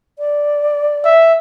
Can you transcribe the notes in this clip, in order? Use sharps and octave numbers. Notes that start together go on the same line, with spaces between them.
D5
E5